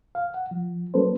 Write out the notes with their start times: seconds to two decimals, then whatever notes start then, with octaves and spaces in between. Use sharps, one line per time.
0.15 F5
0.34 F#5
0.51 F3
0.94 F#3 A#3 C#4 A4 B4 C5